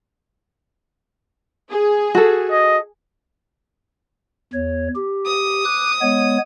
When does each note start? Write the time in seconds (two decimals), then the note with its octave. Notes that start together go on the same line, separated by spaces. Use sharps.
1.70 G#4
2.15 F#4 A4
2.51 D#5
4.53 E2 C#5
4.96 G4
5.26 D#6
5.65 D6 F#6
6.01 G#3 B3 C#5